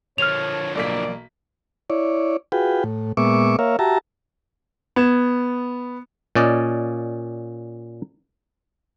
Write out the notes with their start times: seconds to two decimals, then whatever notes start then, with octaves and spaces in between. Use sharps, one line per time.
0.18 D3 F3 C#5 F6 F7
0.75 B1 A#3 D5 B6
1.90 E4 C#5 D5
2.52 F4 F#4 G#4 B4 G5
2.84 A2
3.17 A#2 G#3 B3 E5 C#6 D6
3.59 A#3 A#4 C#5 E5 F5
3.79 F#4 G4 E5 A5 A#5
4.96 B3 G#6 E7
6.35 A#2 C#4 D5 D#5